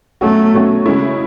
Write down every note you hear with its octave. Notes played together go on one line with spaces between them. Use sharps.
B2 F#3 A3 C#4 F#4
B2 F#3 C#4 F#4
C#3 G#3 C#4 E4